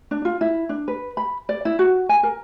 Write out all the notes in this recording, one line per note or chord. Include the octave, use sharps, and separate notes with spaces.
D4
F4
E4
D4
B4
B5
D5
E4
F#4
G#5
A#4